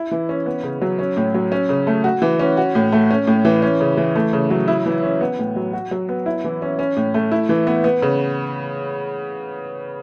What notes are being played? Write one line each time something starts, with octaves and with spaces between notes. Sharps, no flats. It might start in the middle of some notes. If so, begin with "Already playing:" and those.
Already playing: E4
E3
C#4
B3
C#3
F#3
C#4
A2
F#3
C#4
C#3
A3
F#4
E3
C#4
F#4
A2
A3
C#4
A2
E3
C#4
C#3
E3
A3
C#3
F#3
E4
E3
C#4
B3
A2
F#3
F#4
F#3
B3
E4
E3
C#4
C#4
A2
A3
E4
E3
B3
B3
C#3